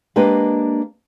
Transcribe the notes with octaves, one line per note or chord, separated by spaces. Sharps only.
G#3 A#3 D4 G4 B4 D#5